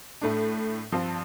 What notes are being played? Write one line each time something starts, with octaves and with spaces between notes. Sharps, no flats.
A2 A3 D4
G2 F3 C4 F4